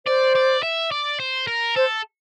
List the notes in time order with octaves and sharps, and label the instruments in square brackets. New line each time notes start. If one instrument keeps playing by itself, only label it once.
[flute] C5 [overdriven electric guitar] D5
[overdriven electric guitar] D5
E5
D5
C5
A#4
[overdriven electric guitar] A4 [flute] C5